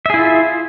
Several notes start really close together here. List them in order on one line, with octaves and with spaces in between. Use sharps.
E5 G#4 E4 F4